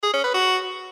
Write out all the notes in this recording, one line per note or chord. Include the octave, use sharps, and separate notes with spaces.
G#4
C#4
B4
F#4